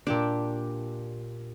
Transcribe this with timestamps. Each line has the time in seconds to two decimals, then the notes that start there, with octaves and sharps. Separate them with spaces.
0.07 A#2 D4 G4 D7